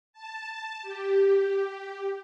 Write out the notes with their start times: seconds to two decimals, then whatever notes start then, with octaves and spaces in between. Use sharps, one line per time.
0.13 A5
0.82 G4